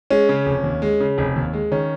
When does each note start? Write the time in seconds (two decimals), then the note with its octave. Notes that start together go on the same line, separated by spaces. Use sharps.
0.10 G#3 C#4
0.29 C#3
0.46 F1
0.64 D#2
0.82 G#3
1.00 C#3
1.18 F1
1.36 D#2
1.53 G#3
1.71 D#3 C#4